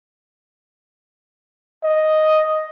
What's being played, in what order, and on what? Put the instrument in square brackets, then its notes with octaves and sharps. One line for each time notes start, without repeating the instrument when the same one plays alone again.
[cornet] D#5